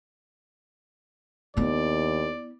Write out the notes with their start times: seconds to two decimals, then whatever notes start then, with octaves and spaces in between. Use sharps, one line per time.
1.57 D#2 B3 E4 D5